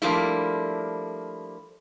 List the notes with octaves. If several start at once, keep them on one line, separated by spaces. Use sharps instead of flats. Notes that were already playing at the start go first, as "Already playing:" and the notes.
F3 G3 A3 A#3 D4 E4